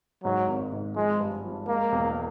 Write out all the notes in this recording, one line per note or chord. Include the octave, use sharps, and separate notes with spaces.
G#2 F#3
G#1
G#2
F3 G#3
G2
F3
G#3 A#3
E1